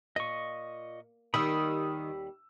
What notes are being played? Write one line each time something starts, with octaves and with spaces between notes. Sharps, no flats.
A#2 D#5 C#6
D#2 D#3 G3 B5 D#6 E6